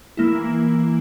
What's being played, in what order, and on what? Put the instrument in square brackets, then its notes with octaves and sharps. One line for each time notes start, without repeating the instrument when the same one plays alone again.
[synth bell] E3 A#3 E4